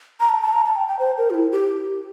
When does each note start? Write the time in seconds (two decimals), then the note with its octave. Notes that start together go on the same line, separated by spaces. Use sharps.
0.20 A#5
0.29 A5
0.42 A5
0.53 A#5
0.65 A5
0.76 G5
0.88 G5
0.99 C5
1.18 A#4
1.30 F4
1.34 E4
1.52 G4